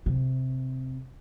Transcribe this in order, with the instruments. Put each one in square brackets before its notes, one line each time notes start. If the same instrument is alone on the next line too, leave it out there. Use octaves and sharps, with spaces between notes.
[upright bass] C3